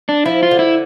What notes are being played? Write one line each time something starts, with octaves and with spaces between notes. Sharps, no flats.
D4
F3 E4
F4
D3
E4